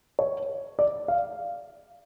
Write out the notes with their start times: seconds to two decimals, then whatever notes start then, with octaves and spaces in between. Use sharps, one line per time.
0.19 C#5
0.79 D5
1.08 F5